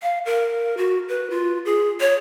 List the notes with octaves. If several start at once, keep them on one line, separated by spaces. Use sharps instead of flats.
F5
A#4
F#4
B4
F4
G#4
C#5